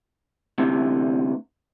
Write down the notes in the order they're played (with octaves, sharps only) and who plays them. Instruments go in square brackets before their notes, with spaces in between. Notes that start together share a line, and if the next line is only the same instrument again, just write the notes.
[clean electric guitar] D2 C3 E3